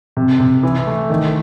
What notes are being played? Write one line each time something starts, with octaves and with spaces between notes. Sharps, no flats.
C3
C3
E3
A3
D#3